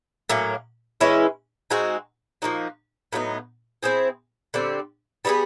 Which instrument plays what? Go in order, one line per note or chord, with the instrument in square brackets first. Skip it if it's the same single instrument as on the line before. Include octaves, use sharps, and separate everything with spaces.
[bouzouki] A2 F#3 A#3 C#4
E3 G#3 C#4 E4
G#3 C4 D#4 F#4
F3 A#3 D#4 F#4
A2 F#3 B3 D#4
C4 E4 G#4 C5
D3 G3 C4
G3 B3 D#4 G#4